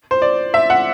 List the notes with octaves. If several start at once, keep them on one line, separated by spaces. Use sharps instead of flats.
C5
D5
E5
F#5